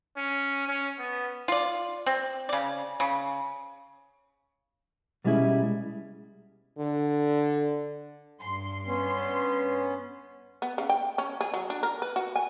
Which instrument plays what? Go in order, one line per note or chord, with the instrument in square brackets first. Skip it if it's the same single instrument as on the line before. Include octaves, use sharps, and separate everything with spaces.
[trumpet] C#4
C#4
B3
[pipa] F4 D5
C4
C#3 D5
C#3
[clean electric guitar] B2 G3 G#3 C#4 E4 G#4
[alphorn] D3
[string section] G2 C6
[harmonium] B3 C#4
[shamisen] B3
C#3
G5
C#4
G#4
F#3
D4
A#4
B4
F#4
G#5